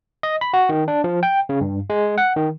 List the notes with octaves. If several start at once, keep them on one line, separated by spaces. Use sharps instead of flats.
D#5
B5
F#4
D#3
D4
F3
G5
C#3
G2
G#3
F#5
D#3